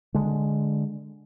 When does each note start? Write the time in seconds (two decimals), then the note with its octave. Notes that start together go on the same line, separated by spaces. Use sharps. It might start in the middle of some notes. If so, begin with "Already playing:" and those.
0.14 D3 G#3